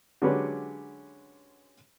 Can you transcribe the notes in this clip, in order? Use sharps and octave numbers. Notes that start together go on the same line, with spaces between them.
D3 F#3 G#3 C#4 G4 B4